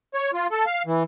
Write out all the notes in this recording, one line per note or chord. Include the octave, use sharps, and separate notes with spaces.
C#5
F4
A4
F5
E3